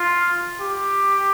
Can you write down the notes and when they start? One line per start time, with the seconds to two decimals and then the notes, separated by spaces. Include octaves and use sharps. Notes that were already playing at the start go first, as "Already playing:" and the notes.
Already playing: F4
0.60 G4